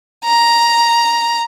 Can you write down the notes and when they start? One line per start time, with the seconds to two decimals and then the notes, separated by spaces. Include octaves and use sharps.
0.25 A#5